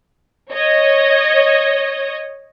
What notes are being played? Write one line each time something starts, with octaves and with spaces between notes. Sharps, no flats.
C#5 D#5